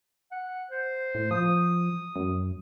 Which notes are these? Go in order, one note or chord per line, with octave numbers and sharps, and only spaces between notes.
F#5
C5
A2
F3 D#6
F#2